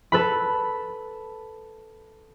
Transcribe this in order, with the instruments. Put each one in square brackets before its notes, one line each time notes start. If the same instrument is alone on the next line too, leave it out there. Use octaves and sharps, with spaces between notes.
[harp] A4 B4 B5